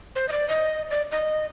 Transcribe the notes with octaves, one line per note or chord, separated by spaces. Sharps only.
C5
D#5
D5
D#5
D5
D#5